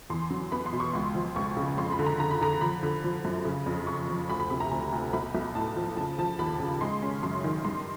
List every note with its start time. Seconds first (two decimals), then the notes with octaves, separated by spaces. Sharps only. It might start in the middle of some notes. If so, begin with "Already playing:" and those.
0.10 E2 C6
0.30 F#3
0.52 B3 B5
0.66 C6
0.73 B2
0.80 C#6
0.94 C#2 C6
1.15 F3
1.36 C#2 C#6
1.57 C#3
1.78 F2 C6
1.92 B5
1.99 D3
2.06 A#5
2.20 D3 A#5
2.31 B5
2.41 D3 A#5
2.61 F3 B5
2.83 D3
3.04 F3
3.25 F#2
3.45 C#3
3.66 F2
3.87 C#3 C#6
4.09 F3
4.29 D2 B5
4.40 B5
4.50 C3 B5
4.60 A#5
4.71 D2 A#5
4.92 D2
5.13 B1 B5
5.35 B1
5.55 A2 A5
5.76 F3
5.97 C#3 A5
6.18 F3 A5
6.39 D#2 B5
6.60 C#3
6.81 G#3 C6
7.02 C#4
7.23 F#2 C6
7.44 D#3
7.65 G2 C6